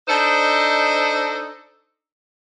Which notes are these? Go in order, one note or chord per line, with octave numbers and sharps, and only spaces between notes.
D4 D#4 A4 C5 D#5